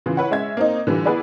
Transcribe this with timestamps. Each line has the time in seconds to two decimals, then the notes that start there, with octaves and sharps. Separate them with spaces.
0.06 C#3 E3 F4
0.17 E4 B4 C#5 F#5
0.30 G#3 C#4 E5 G#6
0.57 A#3 C4 D#4
0.87 D3 E3 G3 F4
1.06 B3 E4 G#4 B4 D5